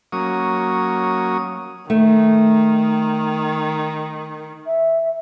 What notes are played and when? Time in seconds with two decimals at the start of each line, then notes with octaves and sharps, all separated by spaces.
0.12 F#3 A#3 C#4 D#6
1.90 D#3 A3
4.66 E5